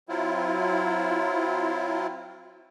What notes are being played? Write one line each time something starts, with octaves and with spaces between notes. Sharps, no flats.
F#3 C4 E4 F4